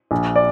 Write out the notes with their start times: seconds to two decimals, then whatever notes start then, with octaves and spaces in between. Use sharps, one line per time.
0.11 A#1
0.36 D5